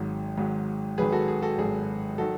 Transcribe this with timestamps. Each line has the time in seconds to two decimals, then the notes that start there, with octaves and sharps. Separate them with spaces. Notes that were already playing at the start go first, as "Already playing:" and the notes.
Already playing: G#1 G#2 F#3
0.37 G#1 G#2 F#3
0.98 G#1 G#2 F#3 G#4 B4
1.12 F#4 A4
1.28 G#4
1.42 F#4 A4
1.58 G#1 G#2 F#3 G#4
2.18 D#3 F#3 F#4 A4